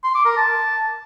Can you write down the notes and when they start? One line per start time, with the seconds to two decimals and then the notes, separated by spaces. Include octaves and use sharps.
0.04 C6
0.15 D6
0.26 A#4
0.37 A5